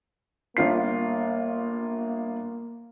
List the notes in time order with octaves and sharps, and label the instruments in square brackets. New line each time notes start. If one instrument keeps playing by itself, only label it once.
[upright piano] G1 F4 C7 [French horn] A#3